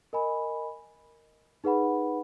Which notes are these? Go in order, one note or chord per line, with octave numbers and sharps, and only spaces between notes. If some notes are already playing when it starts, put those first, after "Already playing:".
A#4 D#5 G#5 B5
D#4 G#4 B4 F#5 B5